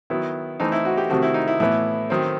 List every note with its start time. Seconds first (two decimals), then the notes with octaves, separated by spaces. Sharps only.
0.10 D#3 F#3 B3 E4
0.60 E3 A3 C4 D#4
0.72 E4
0.85 F#4
0.98 G4
1.10 C3 D#3 A3 C4 F#4
1.23 E4
1.34 D#4
1.48 E4
1.60 A2 E3 B3 E4
2.10 D#3 F#3 C4